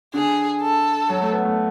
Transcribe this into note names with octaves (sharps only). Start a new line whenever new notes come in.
D3 G#4
A4
F#3
A3
B3
A3